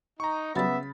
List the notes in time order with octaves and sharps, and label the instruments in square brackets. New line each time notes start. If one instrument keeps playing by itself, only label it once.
[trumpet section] D#4 [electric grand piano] A#5 C#6
[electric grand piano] C#3 B5 A6 [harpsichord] F#3 G3 [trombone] B3 [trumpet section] E5